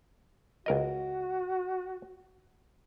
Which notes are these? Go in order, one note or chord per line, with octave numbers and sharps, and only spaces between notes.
C#2 F#4 A#4 D#5